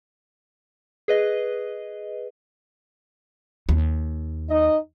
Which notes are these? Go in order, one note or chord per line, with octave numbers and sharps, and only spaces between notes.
G#4 B4 D#5
D#2
D#4 D#5